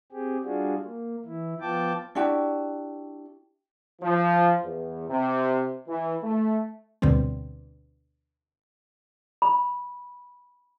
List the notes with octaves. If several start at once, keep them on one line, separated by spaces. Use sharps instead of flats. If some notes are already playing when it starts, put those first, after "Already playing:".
C4 G4 G#4
G3 D4 F4 F#4 G#4
A#3
E3 E4
F3 B3 F4 G5 A5 D6
D4 E4 F#4 G4
F3
E2
C3
E3
A3
D2 B2 D3 G3 C4
B5